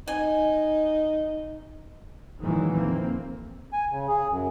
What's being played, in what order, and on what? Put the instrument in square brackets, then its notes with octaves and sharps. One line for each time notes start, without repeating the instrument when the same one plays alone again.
[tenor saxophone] D#4 [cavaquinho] G#5
[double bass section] E2 A#2 D#3 E3 F#3 G#3
F2 A#3 C4
[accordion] G#5
C#3
G#4
F#2